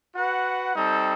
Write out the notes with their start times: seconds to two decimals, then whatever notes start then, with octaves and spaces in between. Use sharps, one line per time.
0.16 F#4 B4 F#5
0.75 G3 C4 D#4 A4